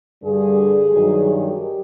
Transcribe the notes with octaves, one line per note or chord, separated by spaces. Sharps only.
G2 D3 G3 G#4
G2 D#3 F#3
G4